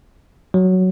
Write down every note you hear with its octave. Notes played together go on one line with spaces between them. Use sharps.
F#3